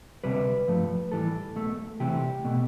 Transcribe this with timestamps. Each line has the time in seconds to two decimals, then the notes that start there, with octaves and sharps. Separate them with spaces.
0.24 D2 C3 G3 B4
0.67 G2 F3 A3
1.12 A2 E3 G3 A4
1.56 B1 B2 A3
2.00 C2 C3 E3 A3 G4
2.45 B2 A3